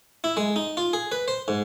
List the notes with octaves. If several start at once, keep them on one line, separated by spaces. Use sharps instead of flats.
E4
G#3
D#4
F4
G#4
B4
C5
G#2